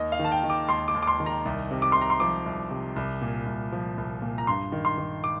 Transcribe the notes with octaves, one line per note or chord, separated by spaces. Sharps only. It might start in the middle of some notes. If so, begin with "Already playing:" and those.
Already playing: D#2 D#5
F5
D#3
A5
G5
D#3
D6
D#2 C6
D6
D#2
D6
C6
D#3
A#5
C2
C3
D6
C2 C6
A#5
C6
F3 D6
C2
C3
C2
A#2
C2
F3
C2
A#2
A#5
G2 C6
D#3
C6
D#3
D6